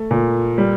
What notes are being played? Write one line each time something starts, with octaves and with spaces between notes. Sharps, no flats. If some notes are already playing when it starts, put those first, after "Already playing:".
Already playing: A3
A#2
G3